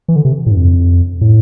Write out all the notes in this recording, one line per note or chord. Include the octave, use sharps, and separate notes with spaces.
E3
D3
C3
A2
G2
F2
A2